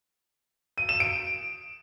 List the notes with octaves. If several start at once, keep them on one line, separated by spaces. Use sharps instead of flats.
D#7
E7
D7